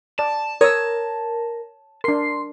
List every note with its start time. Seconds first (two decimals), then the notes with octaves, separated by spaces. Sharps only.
0.19 D5 A5
0.61 A#4 C#5 D#6 E6
2.04 D4 A#4 C6 C7